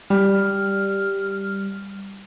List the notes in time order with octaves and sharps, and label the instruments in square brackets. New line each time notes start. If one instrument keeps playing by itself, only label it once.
[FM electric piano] G3 [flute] F6